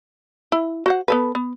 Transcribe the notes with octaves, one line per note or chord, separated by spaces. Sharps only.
E4
F#4 C5 F#5
B3 A4 B4
B3